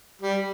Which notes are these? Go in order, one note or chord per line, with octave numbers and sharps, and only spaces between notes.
G3